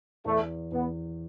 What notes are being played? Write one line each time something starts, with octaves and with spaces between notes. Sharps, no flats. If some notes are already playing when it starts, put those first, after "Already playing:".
E2 A3
E2 B3